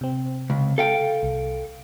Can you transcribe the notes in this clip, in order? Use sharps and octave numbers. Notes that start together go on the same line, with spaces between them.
C3 C4
C#2
A4 F5 G5
C2